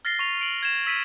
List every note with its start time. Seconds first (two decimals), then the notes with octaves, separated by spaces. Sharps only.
0.05 F6 A6 A#6 C7 G7
0.19 C#6 F7
0.40 C7 D7 F#7
0.63 G#6 E7
0.86 E6 B6 D#7